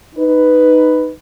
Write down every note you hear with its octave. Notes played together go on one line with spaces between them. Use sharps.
D#4 B4